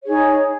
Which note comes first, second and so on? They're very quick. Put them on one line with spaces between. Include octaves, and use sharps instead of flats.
C#5 G#4 D#4